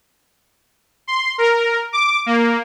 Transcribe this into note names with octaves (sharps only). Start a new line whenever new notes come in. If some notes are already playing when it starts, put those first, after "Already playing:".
C6
A#4
D6
A#3